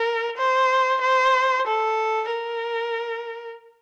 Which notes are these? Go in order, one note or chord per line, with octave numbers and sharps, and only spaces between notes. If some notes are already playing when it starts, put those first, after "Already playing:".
Already playing: A#4
C5
C5
A4
A#4